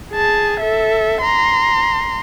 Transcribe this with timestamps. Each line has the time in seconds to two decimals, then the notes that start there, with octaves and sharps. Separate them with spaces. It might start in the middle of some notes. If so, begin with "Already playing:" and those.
0.12 G#4 A5
0.60 A4 E5
1.21 A#5 C6